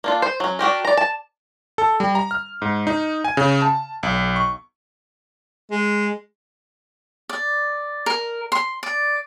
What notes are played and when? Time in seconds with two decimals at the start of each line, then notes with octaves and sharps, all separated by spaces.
0.04 A#3 D4 F4
0.22 C5
0.40 F#3 C#4
0.59 D4 F#4 G4 A#4
0.85 D5 A#5
0.97 A5
1.78 A4
2.00 G3
2.15 A#5
2.31 F6
2.62 G#2
2.87 D#4
3.24 G#5
3.37 C#3
3.62 A5
4.03 B1
4.36 C#6
5.71 G#3
7.29 D5
8.06 A#4
8.52 C6
8.83 D5